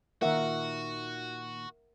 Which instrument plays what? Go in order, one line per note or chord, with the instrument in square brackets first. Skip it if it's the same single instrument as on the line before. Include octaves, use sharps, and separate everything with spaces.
[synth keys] A#2 D#3 [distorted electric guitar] F#4 [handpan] A#4 E5 F#5